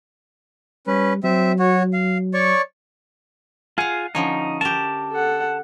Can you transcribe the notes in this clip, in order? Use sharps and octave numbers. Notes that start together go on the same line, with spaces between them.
G3 C#4 B4
F#3 C4 E5
F#4 C#5
F5
C#5 D5 C#6
F4 G#4 F5 F#5 G#5
D3 F3 C#4 D#4
G4 A#4 A5
A4 F#5